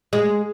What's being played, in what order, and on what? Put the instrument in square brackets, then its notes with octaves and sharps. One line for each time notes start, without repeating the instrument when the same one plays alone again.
[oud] G#3